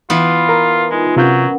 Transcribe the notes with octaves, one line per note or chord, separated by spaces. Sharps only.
E3 B3 F4
A#4 A#5
G#3 D#4 F4
C3 F#3 C#4 F4 A#4 F#5 G6